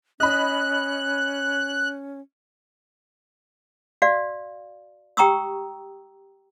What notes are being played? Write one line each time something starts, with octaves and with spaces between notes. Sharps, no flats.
C#4 D#5 B5 F#6
F#4 D5 F5
G4 G5 A#5 C#6 D#6 E6